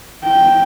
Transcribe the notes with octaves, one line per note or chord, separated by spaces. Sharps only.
G5